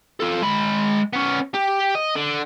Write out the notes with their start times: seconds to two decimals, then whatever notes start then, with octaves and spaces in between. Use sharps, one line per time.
0.20 F4 A4
0.42 G#3 B5
1.13 B3 C#4
1.55 G4
1.95 D#5
2.16 D3